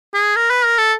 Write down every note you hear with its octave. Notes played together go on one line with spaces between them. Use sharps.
G#4
A#4
B4
A#4
A4